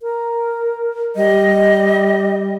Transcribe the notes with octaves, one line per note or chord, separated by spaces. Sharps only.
A#4
G3 D#5